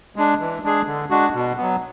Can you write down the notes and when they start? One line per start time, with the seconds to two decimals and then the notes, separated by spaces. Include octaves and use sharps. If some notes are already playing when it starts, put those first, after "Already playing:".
0.16 G#3 D4
0.40 E3
0.63 G#3 D4 G#4
0.86 D3
1.10 G#3 D4 F#4
1.34 B2
1.57 F#3 B3